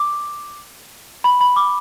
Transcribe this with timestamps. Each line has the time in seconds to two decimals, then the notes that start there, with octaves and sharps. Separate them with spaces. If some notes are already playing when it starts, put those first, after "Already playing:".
Already playing: D6
1.24 B5
1.41 B5
1.56 D6